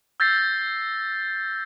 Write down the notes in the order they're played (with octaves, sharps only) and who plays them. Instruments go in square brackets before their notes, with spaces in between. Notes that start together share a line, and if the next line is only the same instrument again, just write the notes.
[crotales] E6 G6 A6 A#6 C7